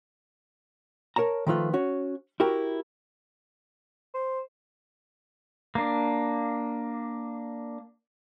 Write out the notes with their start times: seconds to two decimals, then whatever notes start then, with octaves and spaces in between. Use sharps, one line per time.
1.16 A#4 C#5 A5 A#5
1.47 D#3 F3 A3 F4 B4
1.73 C#4 F#4 C#5
2.40 E4 F#4 G4 A#4 G5
4.14 C5
5.75 A#3 D4